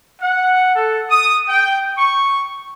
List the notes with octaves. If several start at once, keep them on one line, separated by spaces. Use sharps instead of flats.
F#5
A4
D#6
G5
C#6